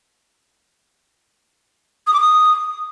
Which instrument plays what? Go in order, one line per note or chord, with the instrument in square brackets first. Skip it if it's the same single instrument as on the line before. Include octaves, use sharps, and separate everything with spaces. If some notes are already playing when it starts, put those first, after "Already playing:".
[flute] D#6
D6
D#6